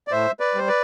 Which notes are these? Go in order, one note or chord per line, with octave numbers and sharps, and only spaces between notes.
D5
A2 C5 E5
B4 D5
G3 C5
B4 D5